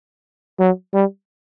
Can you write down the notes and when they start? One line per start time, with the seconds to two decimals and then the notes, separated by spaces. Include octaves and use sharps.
0.60 F#3
0.94 G3